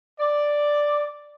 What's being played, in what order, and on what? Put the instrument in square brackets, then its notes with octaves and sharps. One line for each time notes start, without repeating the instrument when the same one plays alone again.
[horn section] D5